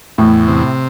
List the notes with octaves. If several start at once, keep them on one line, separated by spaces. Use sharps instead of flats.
E2 A2
C3